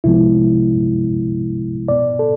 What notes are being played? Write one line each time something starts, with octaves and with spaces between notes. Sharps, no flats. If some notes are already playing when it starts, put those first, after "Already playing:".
C2 C3 F3 G#3 B3 E4
B2 B3 D5
A4